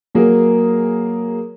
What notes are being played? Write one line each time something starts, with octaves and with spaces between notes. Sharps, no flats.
F#3 A#3 G#4 A#4